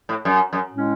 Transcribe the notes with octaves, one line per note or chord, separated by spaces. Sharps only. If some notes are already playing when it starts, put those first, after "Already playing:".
A2
F#2
F#2
A2 G#3 C#4